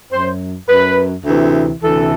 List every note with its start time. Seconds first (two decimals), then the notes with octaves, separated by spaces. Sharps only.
0.11 F#2 F#3 C5
0.69 F#2 F#3 B4
1.25 D2 C3 E3
1.82 D2 C3 E3 A4